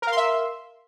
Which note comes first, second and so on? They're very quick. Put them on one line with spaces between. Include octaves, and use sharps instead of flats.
A#4 F5 C6 E5